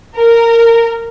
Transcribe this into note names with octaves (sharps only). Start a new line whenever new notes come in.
A#4